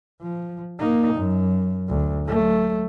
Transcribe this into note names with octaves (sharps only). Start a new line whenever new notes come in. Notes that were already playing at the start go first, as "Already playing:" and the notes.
F3
A#3 D#4
F#2
D2
F#3 A3